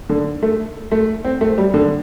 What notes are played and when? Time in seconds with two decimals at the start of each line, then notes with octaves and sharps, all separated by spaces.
0.09 D3
0.43 A3
0.91 A3
1.25 C4
1.41 A3
1.58 G3
1.74 D3